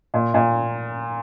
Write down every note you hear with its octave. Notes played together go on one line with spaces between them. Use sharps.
A#2
A#2